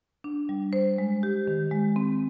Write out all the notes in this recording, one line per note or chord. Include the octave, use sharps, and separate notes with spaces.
D4
G3
C5
G#3
G4
D#3
G#3
C4